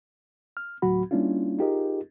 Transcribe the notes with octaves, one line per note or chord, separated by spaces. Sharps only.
F6
D2 A2 F#3 F#4 B5
G3 A#3 C#4 D4 E4 F4
D#4 F4 G4 G#4 A#4 D#5